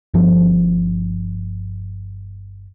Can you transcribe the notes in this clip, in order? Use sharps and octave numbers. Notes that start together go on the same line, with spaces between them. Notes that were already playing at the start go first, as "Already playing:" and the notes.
G1 G2 F3